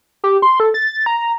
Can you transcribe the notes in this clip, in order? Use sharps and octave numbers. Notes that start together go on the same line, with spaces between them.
G4
C6
A4
A6
A#5